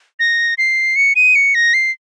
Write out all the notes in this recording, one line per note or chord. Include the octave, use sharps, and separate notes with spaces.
A#6
C7
C#7
D#7
C#7
A#6
C7